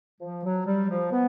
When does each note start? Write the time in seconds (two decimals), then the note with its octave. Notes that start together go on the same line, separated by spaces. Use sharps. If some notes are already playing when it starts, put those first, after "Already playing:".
0.21 F3
0.45 F#3
0.66 G3
0.90 F3
1.12 B3